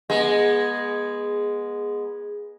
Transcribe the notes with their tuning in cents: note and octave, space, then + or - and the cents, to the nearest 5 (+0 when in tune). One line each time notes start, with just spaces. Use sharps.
G#3 -5 B3 -30